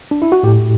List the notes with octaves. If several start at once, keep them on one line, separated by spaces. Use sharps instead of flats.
D4
E4
F#4
A2 G4